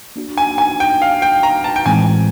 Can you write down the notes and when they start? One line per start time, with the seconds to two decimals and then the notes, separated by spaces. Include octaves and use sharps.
0.16 A#3 D4 F#4
0.37 G#5
0.58 G#5
0.80 G5
1.02 F5
1.22 G5
1.43 A#5
1.64 A5
1.76 G5
1.86 A2 E3 G#3 C4 G#5